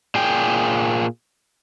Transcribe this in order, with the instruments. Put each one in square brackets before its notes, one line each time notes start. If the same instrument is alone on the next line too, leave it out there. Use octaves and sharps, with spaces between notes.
[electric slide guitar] A#2 G#4 G5